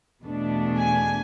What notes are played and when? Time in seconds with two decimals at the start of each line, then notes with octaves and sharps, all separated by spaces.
0.23 E2 B2 A3 D4
0.77 G#5